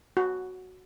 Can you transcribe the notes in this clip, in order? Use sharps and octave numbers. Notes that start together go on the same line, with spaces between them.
F#4